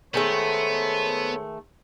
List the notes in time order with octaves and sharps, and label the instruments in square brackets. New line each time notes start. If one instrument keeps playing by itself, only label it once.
[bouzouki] D#3 G#3 A3 [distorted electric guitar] B3 [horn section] A4 C5 C#5